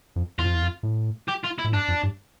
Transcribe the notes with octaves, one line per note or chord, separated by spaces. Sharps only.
F2
E2 F4
F2
E2
F2
A2
G4
F4
E4
A2
G2 D4
F2
G2